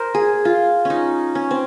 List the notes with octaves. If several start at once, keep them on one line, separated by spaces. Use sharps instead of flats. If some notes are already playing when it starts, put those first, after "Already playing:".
Already playing: A#4 C5
G#4
F4
C#4 D#4
C#4
C4